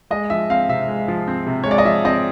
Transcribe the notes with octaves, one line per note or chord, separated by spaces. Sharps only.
G#3 D#5
F3 E5
C4 F5
C3 E5
G#3
F3
C4
C3
G#3 C#5
D5
D#5
F3 E5
C4 D#5